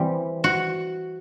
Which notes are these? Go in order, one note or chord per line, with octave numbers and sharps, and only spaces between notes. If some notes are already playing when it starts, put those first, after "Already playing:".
Already playing: E3 G3 C4 G4
F#4